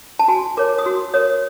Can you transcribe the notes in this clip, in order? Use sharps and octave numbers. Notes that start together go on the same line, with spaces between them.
A5
F#4 G#5
A#4 C#5 D6
D#6
F#4 E6
A#4 C#5 D#6